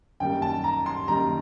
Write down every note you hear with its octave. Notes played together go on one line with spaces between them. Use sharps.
F#2 D#3 G3 A#3 G5
A5
A#5
C6
F#2 D#3 G3 A#3 A#5